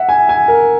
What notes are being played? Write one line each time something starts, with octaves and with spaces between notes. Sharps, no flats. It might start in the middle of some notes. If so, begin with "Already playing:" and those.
Already playing: E5 F#5
G#5
G#5
A#4